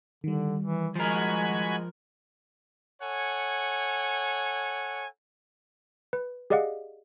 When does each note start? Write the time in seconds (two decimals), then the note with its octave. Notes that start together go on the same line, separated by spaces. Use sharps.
0.24 D3 D#3 G3
0.62 E3
0.95 F3 G#3 F#4 A#4 G#5 B5
3.02 A4 C#5 F#5 G#5
6.13 B4
6.50 G4 G#4 D5 D#5 F5 F#5